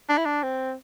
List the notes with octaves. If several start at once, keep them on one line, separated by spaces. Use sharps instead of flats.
D4
E4
D4
C4